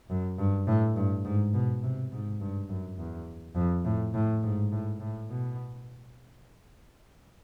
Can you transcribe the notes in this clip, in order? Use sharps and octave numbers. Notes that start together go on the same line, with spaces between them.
F#2
G2
A2
G2
G#2
B2
C3
G#2
G2
F#2
E2
F2
A2
A2
G#2
A2
A2
B2